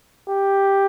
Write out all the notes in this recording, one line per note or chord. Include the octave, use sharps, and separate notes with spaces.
G4